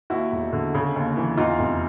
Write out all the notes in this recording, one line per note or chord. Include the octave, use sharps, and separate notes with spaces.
D#2 E4 F#4
E1
D3
C#3
D#2
E3
E2 D#4 F4
F1